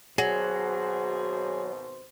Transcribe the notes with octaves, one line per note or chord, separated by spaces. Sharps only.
G#1 B2 F#3 G#4 C5